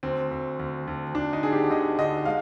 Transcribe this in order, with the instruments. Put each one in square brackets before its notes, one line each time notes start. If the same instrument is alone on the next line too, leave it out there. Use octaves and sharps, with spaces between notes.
[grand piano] D2 C4
D2
D2
D2
D2 D4
D#4
D3 G#4
G4
D2 D#5
D3 D#5
G#3 F5